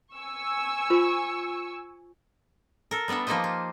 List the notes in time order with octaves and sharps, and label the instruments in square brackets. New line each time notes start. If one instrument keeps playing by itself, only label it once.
[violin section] G#5 C#6 E6
[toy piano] F4 C5
[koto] A4 A#4
G3 B3 D4 A4 E5
F3 A#3 D#4 G4 C5 D#5
F4